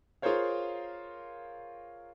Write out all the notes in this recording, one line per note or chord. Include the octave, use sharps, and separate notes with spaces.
F4 G#4 A#4 C5 C#5 F5